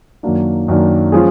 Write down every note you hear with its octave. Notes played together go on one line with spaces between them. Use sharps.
F#2 D#3 F#3 A#3 D4
F#2 D#3 F#3 A#3 D4
F3 G#3 C#4 F4 G#4